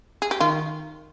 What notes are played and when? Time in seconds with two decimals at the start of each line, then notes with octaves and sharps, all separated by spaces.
0.22 G#4
0.31 G4
0.40 D#3 F4